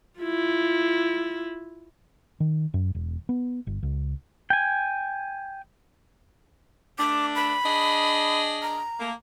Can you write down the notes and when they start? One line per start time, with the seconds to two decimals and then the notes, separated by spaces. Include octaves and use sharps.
0.20 E4 F4
2.40 D#3
2.74 F#2
2.95 E1
3.29 B3
3.67 G1
3.83 C#2
4.50 G5 G#5
6.98 A3 D4 D6
7.35 B5
7.64 D4 G#4 D#5
8.62 A#5
9.00 A3 A#3